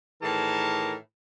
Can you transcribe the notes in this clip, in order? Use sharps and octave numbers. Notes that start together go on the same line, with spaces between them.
A2 D#3 E3 G#4 A#4 A5